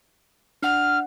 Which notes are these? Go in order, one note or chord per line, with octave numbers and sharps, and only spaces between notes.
D4 F#5 F6